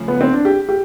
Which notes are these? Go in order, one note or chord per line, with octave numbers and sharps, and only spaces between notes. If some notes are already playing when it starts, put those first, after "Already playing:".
Already playing: C#3 F3 A3 C#4
B3
C4
D4
G4
G4